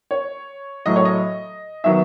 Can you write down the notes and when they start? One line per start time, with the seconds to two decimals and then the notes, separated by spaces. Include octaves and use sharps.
0.11 C#5
0.86 A2 F#3 A3 D#5
0.96 C#5
1.05 D#5
1.84 D#3 F#3 B3 E5